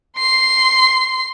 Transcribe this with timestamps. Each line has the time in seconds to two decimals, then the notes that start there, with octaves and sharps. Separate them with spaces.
0.17 C6 C7